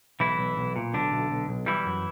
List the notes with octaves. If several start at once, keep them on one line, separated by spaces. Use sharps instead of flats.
B1 E3 E4
B1
B1
A#2
B1 D3 D4
B1
B1
B1
E3 G3 E4
F#2